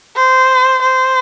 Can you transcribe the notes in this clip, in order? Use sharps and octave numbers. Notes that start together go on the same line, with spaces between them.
C5
C5